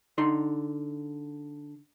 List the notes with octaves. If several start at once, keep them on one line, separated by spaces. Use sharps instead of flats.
D3 D#4 C6